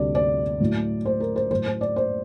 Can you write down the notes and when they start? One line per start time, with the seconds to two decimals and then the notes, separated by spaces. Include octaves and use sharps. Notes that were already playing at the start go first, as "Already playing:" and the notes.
Already playing: D2 C3 G3 D5
0.15 D5
0.60 A2 F#3
1.05 C5
1.20 A#4
1.36 C5
1.51 A2 F#3 C5
1.66 C5
1.81 D5
1.96 C5